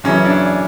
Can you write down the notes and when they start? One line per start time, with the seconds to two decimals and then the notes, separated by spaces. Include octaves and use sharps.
0.04 F#2 C#3 E3 C#4
0.25 D4